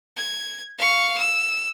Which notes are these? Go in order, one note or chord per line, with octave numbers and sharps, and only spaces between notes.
G#6
F5 C#6
E6